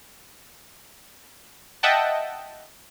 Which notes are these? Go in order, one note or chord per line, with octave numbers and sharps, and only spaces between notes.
D#5 E5 F#5 G5 A5